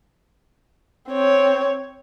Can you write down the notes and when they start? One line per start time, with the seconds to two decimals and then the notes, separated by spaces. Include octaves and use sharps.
1.09 C4 C#5